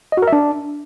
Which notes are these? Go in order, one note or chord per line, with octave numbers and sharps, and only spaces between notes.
D#5
F#4
A#4
E5
D4